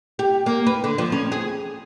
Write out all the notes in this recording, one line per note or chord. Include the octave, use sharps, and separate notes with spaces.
G4
A#3
B4
D3
F3
C#4
G#4